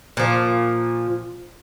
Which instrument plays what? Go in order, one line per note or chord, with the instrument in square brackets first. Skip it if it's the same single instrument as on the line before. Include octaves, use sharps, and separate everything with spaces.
[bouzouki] A#2 F3